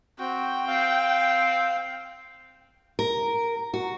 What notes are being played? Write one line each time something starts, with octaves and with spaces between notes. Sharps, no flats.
C4 F#4 G5
C4 F5
A#4
F#4